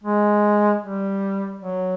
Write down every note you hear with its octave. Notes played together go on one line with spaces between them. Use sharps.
G#3
G3
F#3